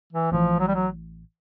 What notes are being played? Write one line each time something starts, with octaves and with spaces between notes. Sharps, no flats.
E3
A1 A2 E3 F3
F#3
G3
F#3